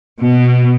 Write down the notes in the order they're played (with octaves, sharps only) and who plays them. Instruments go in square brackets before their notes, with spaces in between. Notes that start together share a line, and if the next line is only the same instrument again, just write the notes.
[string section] B2